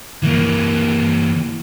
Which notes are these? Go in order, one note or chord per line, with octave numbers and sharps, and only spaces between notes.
E3 A#3